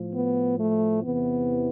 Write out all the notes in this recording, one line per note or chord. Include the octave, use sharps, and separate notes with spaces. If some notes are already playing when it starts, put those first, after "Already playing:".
Already playing: A2 F3
B3
A3
E2 C3 E3 B3